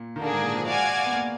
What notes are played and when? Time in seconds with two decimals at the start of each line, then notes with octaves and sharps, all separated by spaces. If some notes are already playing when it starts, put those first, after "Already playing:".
Already playing: A#2
0.16 D#3
0.21 D3 A#3 D4 G#4
0.33 G#2
0.44 A#2
0.55 F3
0.67 G#3 F#4 D5 F5 G#5
1.05 B3
1.12 A#3